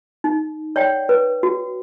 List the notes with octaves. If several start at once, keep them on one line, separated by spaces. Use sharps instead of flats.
D#4
C#5 D5 F#5 G5
B4
F#4